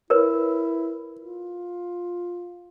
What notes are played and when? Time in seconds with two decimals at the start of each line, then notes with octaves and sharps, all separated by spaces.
0.10 E4 A#4 B4 C#5
1.20 F4